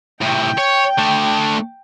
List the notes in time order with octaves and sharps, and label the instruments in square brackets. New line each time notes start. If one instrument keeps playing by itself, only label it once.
[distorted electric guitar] A2 C3 [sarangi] G5
[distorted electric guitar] C#5
A3 D4